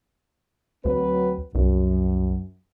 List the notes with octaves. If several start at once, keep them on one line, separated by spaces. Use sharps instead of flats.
D2 F#3 C4 B4
C2 F#2